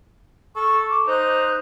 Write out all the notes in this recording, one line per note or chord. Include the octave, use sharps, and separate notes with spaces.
A4 C#6 F6
D6
D#4 C5 F#6